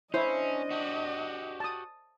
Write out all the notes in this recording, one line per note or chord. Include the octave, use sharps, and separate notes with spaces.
C#4 D4 E4 C5 D#5
F#4 G4
A5 D#6